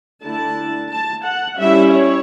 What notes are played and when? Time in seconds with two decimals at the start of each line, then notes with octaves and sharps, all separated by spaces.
0.22 D3 A3 E4 A5
0.90 A5
1.24 F#5
1.57 G3 C#4 E4 E5
1.92 C#5